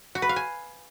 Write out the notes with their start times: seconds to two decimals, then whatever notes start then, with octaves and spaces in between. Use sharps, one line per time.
0.15 F#4
0.22 B4
0.29 F5
0.36 G#5